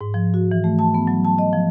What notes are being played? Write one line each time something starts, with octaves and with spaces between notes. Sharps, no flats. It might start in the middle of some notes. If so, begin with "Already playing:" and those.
G#2
F3
F#4
E3
A3
A5
B3
F#3
A5
D#5
F3